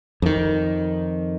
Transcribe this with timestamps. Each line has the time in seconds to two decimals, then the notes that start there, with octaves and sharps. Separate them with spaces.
0.22 F2 D#3